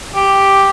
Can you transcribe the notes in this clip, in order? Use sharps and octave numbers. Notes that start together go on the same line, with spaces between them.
G4